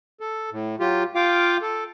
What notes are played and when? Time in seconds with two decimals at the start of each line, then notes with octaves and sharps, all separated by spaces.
0.20 A4
0.52 A2
0.80 F#3 F4 G4
1.15 F4 F5 G5 D6
1.62 A4